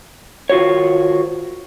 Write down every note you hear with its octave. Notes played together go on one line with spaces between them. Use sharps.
D#3 F4 F#4 C5 C#5